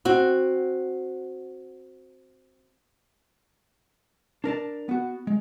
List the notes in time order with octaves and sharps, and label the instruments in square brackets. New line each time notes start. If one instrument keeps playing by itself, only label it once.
[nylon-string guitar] C4 F#4
[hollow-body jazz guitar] D4 A#4 D5 A5
B3 F#4
G#3